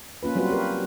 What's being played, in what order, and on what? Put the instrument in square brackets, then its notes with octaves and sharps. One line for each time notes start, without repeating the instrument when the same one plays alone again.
[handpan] A#3 C#4 F4 B4
F#3 G3 C4 F4 F#4 B4
G4 A#4 B4